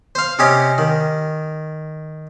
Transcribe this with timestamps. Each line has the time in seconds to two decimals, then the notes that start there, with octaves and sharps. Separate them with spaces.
0.15 C5 F5
0.39 C3 C#4 G4 D#5
0.78 D#3